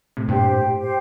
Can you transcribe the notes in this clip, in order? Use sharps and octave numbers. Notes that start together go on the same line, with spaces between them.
A2 C3
G2 A#2 G4 C5 G5
A2
G4 C5 G5